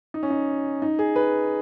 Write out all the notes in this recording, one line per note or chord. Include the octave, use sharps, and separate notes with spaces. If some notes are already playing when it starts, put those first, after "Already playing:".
D#4
C#4
D#4
D#4
G#4
B4